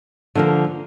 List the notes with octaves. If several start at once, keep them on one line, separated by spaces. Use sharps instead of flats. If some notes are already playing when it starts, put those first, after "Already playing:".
D3 F3 A#3